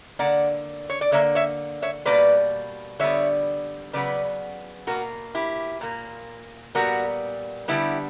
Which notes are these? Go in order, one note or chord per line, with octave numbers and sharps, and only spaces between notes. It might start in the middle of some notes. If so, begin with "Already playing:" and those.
D3 A#3 D5 F#5
C#5
D5
D3 A#3 C#5 E5
C#5 E5
C#5 E5
B2 G3 A#3 B4 D5
D3 G3 B3 C#5 E5
C#3 F#3 B3 B4 D5
B2 A#3 F#4 A#4
E4 G4
A#2 A#3
A#2 G3 B3 F#4 A#4
D3 G3 B3 E4 G4